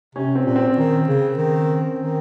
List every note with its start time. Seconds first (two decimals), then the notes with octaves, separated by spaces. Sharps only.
0.15 C3 C#4
0.35 C4
0.45 A#2
0.56 C4
0.76 D#3 C#4
1.08 C#3
1.38 D#3
1.99 D#3